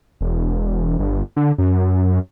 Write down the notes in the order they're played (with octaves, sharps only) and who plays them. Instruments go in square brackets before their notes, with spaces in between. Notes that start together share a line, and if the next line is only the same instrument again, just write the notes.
[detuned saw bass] E1
G1
D3
F#2